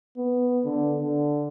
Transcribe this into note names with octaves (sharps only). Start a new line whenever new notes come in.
B3
D3
D3